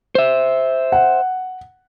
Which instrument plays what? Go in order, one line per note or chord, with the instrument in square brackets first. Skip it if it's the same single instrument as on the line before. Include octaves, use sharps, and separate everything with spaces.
[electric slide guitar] C5 E5
[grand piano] F#5